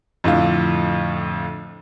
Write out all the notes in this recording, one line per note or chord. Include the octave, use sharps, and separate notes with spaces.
F2 A2 D3 F4